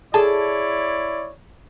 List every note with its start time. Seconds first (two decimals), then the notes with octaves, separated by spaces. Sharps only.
0.14 E4 G#4 A4 C#5 D5 A5